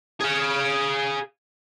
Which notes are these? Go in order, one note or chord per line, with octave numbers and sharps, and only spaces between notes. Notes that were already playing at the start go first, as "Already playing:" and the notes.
G#4 F5